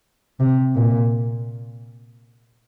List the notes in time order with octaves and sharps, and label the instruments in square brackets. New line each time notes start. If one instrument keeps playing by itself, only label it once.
[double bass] C3
A#2